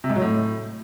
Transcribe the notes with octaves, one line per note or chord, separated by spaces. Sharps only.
C3
G#2
F#3
A2